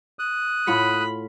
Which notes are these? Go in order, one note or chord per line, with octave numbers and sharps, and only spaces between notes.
D#6 F#6
A2 F4 F#5 B5